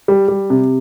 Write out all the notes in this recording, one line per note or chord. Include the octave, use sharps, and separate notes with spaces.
G3
G3
C3